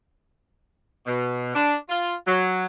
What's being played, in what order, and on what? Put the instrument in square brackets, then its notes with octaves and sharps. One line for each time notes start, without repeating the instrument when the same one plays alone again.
[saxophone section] B2
D4
F4
F#3